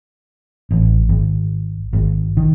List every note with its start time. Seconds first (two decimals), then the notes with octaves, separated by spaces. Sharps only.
0.71 A1
1.09 G#1
1.93 G#1
2.37 D#3